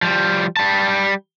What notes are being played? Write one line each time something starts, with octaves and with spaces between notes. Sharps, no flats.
F3 G3
G3 A5